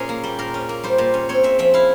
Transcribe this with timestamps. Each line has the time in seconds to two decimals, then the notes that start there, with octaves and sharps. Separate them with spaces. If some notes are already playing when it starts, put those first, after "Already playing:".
Already playing: A#2 C#4 G#4 A#4
0.09 A#3
0.24 G3
0.39 A#2 A#4
0.54 C#4
0.69 A#3
0.83 G3 C5
0.98 A#2
1.14 C#4
1.29 C4 C#5
1.43 G#3 E5
1.59 F3 E5
1.74 E4 F5